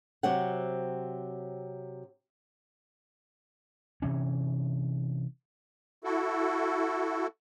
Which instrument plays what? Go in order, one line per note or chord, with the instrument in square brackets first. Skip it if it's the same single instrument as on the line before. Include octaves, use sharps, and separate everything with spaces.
[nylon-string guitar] C3 F#3 C4 F#5
[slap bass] C3 E3 C#4
[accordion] E4 F#4 A4